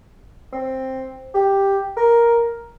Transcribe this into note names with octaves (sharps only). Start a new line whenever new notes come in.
C4
G4
A#4